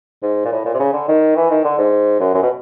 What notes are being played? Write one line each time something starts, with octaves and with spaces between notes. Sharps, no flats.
G#2
A#2
A2
A#2
C3
C#3
D3
D#3
E3
D#3
D3
G#2
F#2
F#2
B2